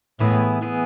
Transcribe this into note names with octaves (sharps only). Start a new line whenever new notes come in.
A2 E3 B3 E4 G#4
E3 B3 E4 G#4